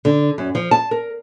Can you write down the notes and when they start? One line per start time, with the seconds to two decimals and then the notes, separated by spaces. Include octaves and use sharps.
0.05 D3
0.38 F#2
0.55 F3
0.71 A5
0.91 A#4